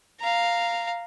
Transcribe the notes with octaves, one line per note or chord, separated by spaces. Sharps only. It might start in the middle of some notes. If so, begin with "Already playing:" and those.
F5 A#5